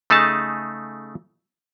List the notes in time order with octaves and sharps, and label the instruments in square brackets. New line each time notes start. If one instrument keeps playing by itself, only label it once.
[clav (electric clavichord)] C#3 A3 D#4 G#4 A5